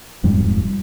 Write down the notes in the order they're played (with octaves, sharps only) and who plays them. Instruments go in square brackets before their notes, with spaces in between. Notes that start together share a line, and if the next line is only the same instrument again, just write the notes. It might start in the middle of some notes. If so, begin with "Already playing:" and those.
[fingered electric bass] D#1 F2 G#2 G3